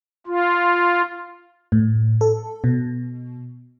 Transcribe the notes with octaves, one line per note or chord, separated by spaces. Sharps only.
F4
A2
A4
B2